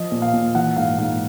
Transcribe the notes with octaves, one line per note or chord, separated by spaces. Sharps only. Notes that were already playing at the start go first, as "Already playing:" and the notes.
Already playing: F3 D#5
A#2
F5
A#2
E3 F#5
G#2 F5
G#2 F5